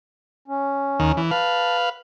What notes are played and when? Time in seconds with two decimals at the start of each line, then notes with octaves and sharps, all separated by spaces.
0.48 C#4
1.00 D#2 D#3 A#5
1.17 E3
1.31 B4 F5 A5